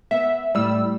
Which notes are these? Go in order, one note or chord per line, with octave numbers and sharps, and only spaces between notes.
B3 E5
A2 G3 E6